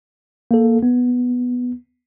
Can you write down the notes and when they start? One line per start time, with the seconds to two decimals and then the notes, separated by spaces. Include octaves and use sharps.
0.51 A#3 A4
0.83 B3